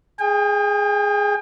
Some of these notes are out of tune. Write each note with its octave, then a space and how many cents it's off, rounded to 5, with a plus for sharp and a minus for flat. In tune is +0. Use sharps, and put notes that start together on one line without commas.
G#4 +0 G5 +40